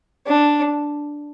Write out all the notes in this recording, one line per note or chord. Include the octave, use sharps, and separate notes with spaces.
D4